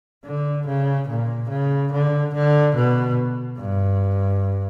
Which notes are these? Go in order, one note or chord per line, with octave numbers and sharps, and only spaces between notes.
D3
C#3
A#2
C#3
D3
D3
B2
G2